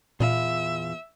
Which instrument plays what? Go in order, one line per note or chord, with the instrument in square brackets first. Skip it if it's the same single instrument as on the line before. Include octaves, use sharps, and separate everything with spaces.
[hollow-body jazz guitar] E2 F4 [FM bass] A#2 [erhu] E5